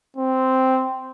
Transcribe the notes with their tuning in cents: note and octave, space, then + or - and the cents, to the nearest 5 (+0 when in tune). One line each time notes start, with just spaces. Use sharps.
C4 -5